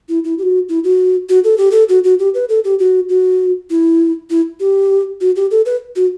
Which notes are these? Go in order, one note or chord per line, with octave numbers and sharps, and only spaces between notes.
E4
E4
G4
F#4
E4
F#4
F#4
A4
G4
A4
F#4
F#4
G4
B4
A4
G4
F#4
F#4
E4
E4
G4
F#4
G4
A4
B4
F#4